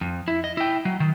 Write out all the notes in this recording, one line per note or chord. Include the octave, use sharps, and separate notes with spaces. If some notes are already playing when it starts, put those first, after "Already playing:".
F2
E4
D#5
E4 G5
F#3
D#3